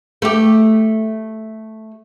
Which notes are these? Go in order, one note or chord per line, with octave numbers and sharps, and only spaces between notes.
A3 G4